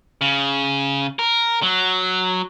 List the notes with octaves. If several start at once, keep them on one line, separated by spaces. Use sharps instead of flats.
C#3
A#4
F#3